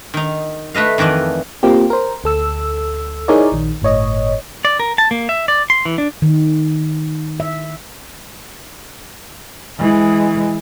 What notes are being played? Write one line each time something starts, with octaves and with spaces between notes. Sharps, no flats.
D#3 D#4
A3 B4 D#5 F5
F2 D#3 E3 D5 D#5
A#3 C4 F4 G4
A#4 C5
D2 A4 E6
D#4 E4 G#4 A#4 C#5 D5
A#1 D#3
G1 A2 C#5 D#5
D5
A#4
A5
A#3
E5
D5
C6
E3
D4
D#3
E5
E3 G#3